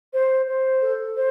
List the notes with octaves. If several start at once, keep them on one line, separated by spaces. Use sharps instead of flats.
C5
C5
A4
C5